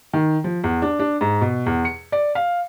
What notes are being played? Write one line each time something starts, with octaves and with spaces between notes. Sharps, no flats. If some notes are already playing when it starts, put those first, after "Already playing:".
D#3
F3
E2
D4
D4
G#2
B2
E2
C#7
D5
F5